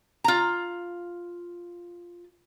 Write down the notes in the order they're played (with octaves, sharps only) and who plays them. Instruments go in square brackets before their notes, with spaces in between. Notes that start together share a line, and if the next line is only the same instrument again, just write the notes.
[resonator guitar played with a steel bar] F4 A#5